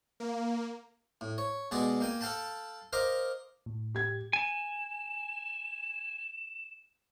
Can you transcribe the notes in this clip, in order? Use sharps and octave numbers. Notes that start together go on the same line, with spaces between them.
A#3
A2
C#5
B2 G#3 G#4 D5
A#3 G5 G#5
A4 F5 G5 A5 B5
A#4 C5 D#5 F5 A#5 D6
A2
G4 G#6
G#5 E7